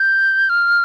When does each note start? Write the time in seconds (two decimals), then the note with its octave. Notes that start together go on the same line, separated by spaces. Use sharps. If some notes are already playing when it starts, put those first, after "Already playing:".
Already playing: G6
0.49 F6